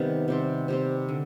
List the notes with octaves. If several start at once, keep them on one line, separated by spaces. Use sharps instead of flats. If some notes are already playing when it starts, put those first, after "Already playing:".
Already playing: C3 D#3 G3 B3
C3 G3 C4
C3 G3 C4
D3